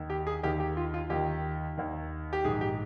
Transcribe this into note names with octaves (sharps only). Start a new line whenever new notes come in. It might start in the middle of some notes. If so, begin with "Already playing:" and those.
Already playing: D#2 D#3
G4
G#4
D#2 D#3 G4
G4
F4
F4
D#2 D#3 G4
D#2 D#3
G4
A#1 G#2 D#3 G#4
G4